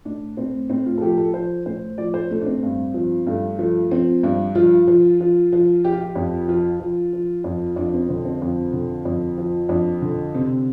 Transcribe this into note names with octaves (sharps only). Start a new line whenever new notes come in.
A2 D4
A2 C4
A2 C4
F4
A4
F3 G4
A4
F3 C5
A2 C5
F3 D5
C5
A2 A3
D4
C4
G2
F3
G2 A3
F3 A3
F3 C4
G2 D4
F3 F4
F3
F3
F3
F3 G4
F4
G4
F2
F3 F4
F3
F3
F2
F2 D4
C4
D3 C4
C4
F2
D3
F2
F3
F2 D4
D3
C3